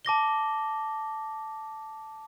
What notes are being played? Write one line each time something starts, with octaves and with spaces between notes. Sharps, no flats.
A5 D6 A#6 G7